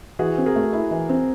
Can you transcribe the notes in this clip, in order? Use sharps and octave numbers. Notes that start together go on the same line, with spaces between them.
E3 F#4 G#4
C4
G#4 A#4
A3
E4
E3
C4